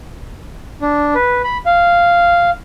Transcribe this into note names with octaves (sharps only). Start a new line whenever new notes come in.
D4
B4
B5
F5